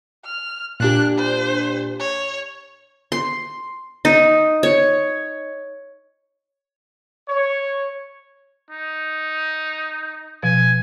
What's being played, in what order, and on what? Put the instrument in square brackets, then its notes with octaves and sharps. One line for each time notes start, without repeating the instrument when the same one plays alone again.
[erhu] F6
[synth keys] A#2 D4 G4 [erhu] F#6
[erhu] C5
C#5
[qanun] C6
D#4
C#5
[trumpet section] C#5
[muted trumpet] D#4
[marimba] B2 F3 [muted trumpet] G#5